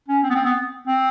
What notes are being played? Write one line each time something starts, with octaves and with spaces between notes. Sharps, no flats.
C#4
C4
B3
C4
B3
C4